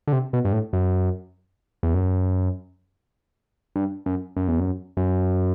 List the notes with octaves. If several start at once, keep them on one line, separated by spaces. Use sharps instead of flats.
D3
C3
B2
G2
A2
F#2
E2
F#2
G2
F#2
F#2
E2
F#2
F#2